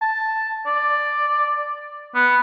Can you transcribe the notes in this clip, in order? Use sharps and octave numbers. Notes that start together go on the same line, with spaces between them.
A5
D5
B3